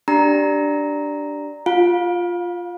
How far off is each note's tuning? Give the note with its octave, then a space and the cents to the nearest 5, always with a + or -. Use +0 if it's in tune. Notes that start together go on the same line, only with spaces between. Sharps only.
D4 +0 G4 -10 A#5 +0
F4 +0 F5 +30